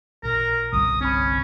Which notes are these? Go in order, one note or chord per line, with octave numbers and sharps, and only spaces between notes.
A1 A#2 A#4
G1 C2 D#6
C4 C#4 B5